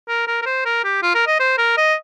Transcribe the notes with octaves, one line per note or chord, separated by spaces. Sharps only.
A#4
A#4
A#4
C5
A#4
G4
F4
A#4
D#5
C5
A#4
D#5